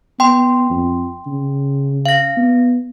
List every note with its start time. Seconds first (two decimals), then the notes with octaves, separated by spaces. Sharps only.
0.20 B3 G5 C6
0.70 F2
1.27 C#3
2.06 F5 A#6
2.37 B3